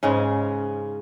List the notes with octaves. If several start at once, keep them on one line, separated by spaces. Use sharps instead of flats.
G#2 C#3 G#3 C#4